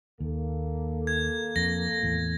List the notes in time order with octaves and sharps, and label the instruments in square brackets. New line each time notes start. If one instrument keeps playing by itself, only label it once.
[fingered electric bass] D#2 [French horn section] A#3 A4
[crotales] G#6
[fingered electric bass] F2 [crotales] A#6
[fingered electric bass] E2 A2